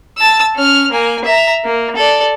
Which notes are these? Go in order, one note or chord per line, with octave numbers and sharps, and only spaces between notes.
A5 E6
C#4 F6
A#3 G#5
E5 A#5
A#3
A4 D5